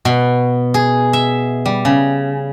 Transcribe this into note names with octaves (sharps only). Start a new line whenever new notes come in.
B2
G#4
E5
G3
C#3